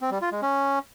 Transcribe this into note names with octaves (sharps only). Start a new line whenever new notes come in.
C4
G3
F4
G#3
C#4